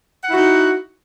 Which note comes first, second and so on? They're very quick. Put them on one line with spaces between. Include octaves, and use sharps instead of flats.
F#5 E4 F#4 D#4